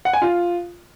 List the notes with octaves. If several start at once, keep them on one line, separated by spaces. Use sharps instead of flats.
F#5
G#5
F4